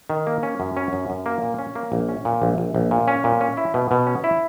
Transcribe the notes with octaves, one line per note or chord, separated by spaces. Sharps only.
D#3
A#3
C#4
F#2
C#4
F#2
F#2
A#3
A#2
C#4
A#3
A#1
C#4
A#2
A#1
A#1
A#1
A#2
C#4
A#2
C#4
E4
B2
B2
C#4
E4